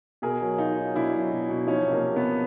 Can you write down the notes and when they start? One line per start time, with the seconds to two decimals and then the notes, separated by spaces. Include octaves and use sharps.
0.22 B2 G#4 A#4
0.41 F#3
0.58 F#3 D#4 F4
0.77 F#3
0.95 B2 D4 E4
1.13 F#3
1.31 B2
1.50 B2
1.67 F3 C#4 D#4
1.86 C3
1.92 A#3
2.03 C3
2.16 B3
2.22 C3